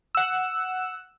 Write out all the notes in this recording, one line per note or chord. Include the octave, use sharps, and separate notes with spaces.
F#5 E6